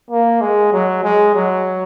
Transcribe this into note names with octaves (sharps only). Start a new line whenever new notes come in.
A#3
G#3
F#3
G#3
F#3